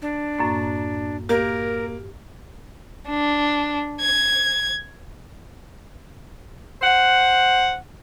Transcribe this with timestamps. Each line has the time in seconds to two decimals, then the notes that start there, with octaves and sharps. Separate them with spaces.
0.02 D4
0.39 F#2 A2 A#3
1.29 A#3 G4 A#4
3.08 D4
4.01 G#6
6.82 C5 F#5